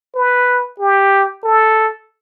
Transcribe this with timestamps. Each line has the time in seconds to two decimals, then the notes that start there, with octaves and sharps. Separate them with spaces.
0.15 B4
0.79 G4
1.44 A4